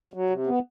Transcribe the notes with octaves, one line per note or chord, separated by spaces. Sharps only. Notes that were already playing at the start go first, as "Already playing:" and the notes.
F#3
C3
B3